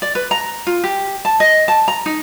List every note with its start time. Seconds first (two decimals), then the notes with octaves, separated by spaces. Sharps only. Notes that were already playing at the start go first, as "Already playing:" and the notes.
0.02 D5
0.15 B4
0.31 A#5
0.67 F4
0.84 G4
1.25 A5
1.40 D#5
1.68 A5
1.88 A#5
2.06 D#4